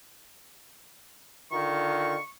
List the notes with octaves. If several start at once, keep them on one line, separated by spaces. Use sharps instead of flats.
D3 D#3 F4 C#6